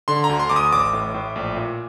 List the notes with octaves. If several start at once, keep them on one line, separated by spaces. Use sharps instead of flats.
D3 C6
A#5
D2
C6
D2 D6
D#6
A1 D6
A2
A2
A#1
A#2